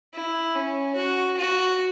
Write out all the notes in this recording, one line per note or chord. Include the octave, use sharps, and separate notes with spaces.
E4
C#4
F#4
F#4